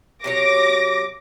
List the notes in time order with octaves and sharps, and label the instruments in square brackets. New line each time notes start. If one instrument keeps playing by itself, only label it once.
[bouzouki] C3 F#3 C#5 [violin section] D6 A#6